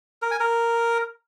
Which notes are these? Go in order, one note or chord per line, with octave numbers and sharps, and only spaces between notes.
A#4
G#5
A#4